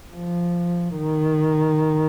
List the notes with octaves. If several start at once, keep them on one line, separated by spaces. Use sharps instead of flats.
F3
D#3